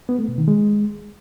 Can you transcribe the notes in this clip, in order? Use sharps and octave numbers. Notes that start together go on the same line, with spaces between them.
B3
A3
B2
D#3
G#3